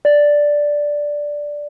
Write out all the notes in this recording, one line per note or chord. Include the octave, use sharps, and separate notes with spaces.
D5